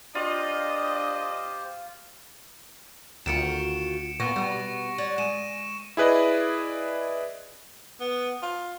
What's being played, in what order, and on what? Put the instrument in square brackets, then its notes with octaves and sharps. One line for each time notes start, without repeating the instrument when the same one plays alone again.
[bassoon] D4 [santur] F4 [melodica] G4 C5 [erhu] D#5
[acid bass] D2 [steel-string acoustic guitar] D#3 F4 F#4 [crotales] C#7 D7 E7
[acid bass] A#2 [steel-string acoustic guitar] B3 [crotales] C#6 A#6
[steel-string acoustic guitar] B2 B3 [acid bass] G3
[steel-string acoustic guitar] C#5 D5 F#5
[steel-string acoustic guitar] G#3 [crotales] D#7 E7
[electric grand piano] E4 G#4 B4 D5 D#5
[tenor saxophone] B3
F4